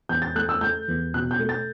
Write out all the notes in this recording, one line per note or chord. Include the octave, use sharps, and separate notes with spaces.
E2 G6
A6
A3 F#6
E6
A3 G6
E2
B2 F#6
G6
A3
A6